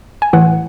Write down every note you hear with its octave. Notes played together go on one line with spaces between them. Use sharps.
G#5
A2 E3 F#5